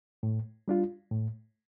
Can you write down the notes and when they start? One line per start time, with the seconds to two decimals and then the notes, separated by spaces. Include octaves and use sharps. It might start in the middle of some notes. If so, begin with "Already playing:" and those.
0.23 A2
0.68 G3 D4 F4
1.11 A2